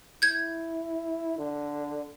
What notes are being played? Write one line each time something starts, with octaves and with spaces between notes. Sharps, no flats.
E4 G6 G#6
D3